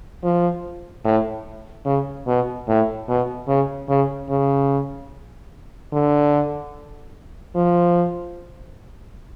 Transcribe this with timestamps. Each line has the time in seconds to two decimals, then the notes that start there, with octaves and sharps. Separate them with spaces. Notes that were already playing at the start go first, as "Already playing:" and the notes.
0.24 F3
1.05 A2
1.85 C#3
2.27 B2
2.68 A2
3.09 B2
3.48 C#3
3.89 C#3
4.30 C#3
5.93 D3
7.55 F3